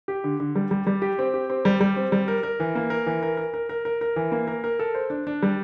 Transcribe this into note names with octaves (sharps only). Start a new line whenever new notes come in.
G4
D3
D3
G3
G3
G3
G4
C4
G4
C4
G3
G3
C4
G3
A#4
A#4
E3
A#3
A#4
E3
A#4
A#4
A#4
A#4
A#4
A#4
E3
A#3
A#4
A#4
A4
C5
D4
D4
G3